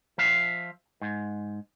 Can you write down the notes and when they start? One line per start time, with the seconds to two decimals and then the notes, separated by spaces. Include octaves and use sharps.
0.18 F3 E5 F5
1.01 G#2